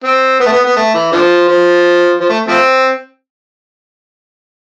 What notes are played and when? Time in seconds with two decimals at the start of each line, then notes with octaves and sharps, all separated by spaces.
0.04 C4
0.40 B3
0.46 A3
0.52 B3
0.64 B3
0.76 A3
0.94 E3
1.12 D3 F3
1.48 F3
2.20 F3
2.29 A3
2.48 F3 A3 C4